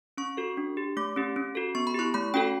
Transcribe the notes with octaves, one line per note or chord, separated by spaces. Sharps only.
C#4 C#6
F#4 A4
D4
G4
A3 D6
C#4 G4
C#4
F#4 A4
B3 C#6
B5
E4 G4 C#6
A3 B5
C#4 F#4 A4 G5